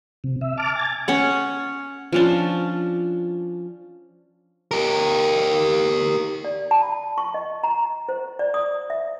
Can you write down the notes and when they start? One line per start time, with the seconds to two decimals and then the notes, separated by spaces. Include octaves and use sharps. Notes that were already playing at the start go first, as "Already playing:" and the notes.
0.24 C3
0.41 E5
0.58 A5 D6 F6
0.76 G#5 A6
1.08 C#4 C#5 F#5
2.12 F3 C#4 D4
4.71 G4 A#4
6.45 D5
6.71 A5
6.82 B5
7.18 C#6
7.34 D#5
7.63 A#5
8.09 C5
8.39 D5
8.54 D#6
8.90 E5